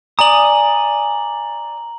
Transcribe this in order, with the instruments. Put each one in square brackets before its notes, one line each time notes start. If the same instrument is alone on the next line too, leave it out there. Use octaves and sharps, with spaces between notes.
[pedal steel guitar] D5 G#5 D#6 [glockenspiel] A#5 F#7